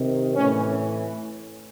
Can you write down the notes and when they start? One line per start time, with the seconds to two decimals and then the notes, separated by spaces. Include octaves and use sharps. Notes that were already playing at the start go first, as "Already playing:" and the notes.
Already playing: C3 D#3
0.35 A2 E3 C#4